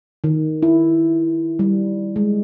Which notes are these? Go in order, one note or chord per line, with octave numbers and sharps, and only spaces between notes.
D#3
E4
G3
G#3